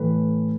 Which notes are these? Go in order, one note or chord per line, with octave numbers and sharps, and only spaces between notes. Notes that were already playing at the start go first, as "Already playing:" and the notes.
Already playing: A2 E3 A3 B4